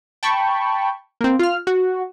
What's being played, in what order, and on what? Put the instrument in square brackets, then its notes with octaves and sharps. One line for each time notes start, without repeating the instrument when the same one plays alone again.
[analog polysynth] G5 A5 B5 C#6
A#3 C4
F4 F6
F#4